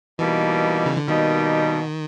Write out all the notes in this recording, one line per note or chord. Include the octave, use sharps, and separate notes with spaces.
B2 E3 G3 A#3 D#4
C#3
D3
B2 D#3 G3 A#3 D#4